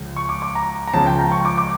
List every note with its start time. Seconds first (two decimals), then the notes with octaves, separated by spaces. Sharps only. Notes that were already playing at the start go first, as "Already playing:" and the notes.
Already playing: C#2 C#3 F3
0.16 C#6
0.29 D6
0.42 D6
0.55 A#5
0.87 A#5
0.93 C#2 C#3 F3 A5
1.06 G5
1.19 A#5
1.32 C#6
1.45 D6
1.58 D6